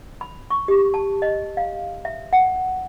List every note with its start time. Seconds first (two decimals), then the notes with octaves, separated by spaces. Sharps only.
0.21 B5
0.50 C#6
0.68 G4
0.94 A5
1.22 D#5
1.57 F5
2.05 E5
2.33 F#5